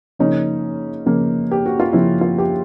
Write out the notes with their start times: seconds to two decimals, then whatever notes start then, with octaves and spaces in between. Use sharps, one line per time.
0.19 C#3 F3 A#3 C#4 D#4
1.06 C#3 F3 A#3 C#4
1.51 G4
1.66 F#4
1.80 F4
1.93 C#3 F3 A#3 C#4 E4
2.21 F4
2.38 G4